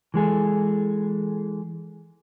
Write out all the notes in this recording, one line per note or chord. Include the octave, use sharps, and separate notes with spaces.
E3 G#3 G#4 A4